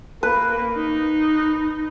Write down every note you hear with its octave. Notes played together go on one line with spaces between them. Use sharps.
A#3 B4
D#4